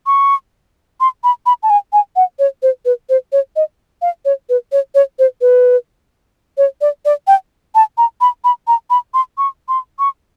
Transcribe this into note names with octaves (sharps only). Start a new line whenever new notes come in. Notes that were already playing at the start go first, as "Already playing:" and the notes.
C#6
C6
B5
B5
A5
G#5
G#5
F#5
C#5
C5
B4
C5
C#5
D#5
F5
C#5
B4
C#5
C#5
C5
B4
C#5
D5
D5
G5
A5
A#5
B5
B5
A#5
B5
C6
C#6
C6
C#6